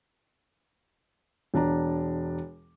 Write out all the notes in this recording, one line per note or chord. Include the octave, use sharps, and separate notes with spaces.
E1 D4 A#5